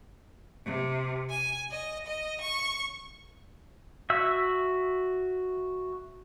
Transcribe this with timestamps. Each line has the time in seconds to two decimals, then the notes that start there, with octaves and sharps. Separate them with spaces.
0.64 C3
1.30 G#5
1.70 D#5
2.06 D#5
2.41 C#6
4.10 F#4 E5 E6